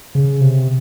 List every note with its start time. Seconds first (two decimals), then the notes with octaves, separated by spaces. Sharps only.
0.15 C#3
0.41 C3